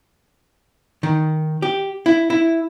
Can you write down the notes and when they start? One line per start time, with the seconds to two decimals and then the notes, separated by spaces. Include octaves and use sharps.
1.03 D#3
1.62 G4
2.06 E4
2.30 E4